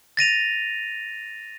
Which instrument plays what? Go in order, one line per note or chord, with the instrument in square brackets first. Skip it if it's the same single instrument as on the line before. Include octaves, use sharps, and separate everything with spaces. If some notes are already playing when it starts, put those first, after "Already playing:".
[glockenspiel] A6 A#6 D#7 F7